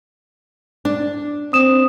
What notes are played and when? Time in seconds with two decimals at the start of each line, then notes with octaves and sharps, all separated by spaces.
0.85 D4
1.53 C4 D#6 E7